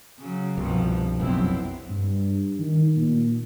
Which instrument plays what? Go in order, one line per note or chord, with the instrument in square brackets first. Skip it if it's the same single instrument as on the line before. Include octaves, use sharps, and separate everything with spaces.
[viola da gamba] C#3 F#3
[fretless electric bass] C2 [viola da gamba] G2 B2 F3
[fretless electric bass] F1 B1 F#2 [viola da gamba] B3 C4 E4
[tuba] G2
D#3
A#2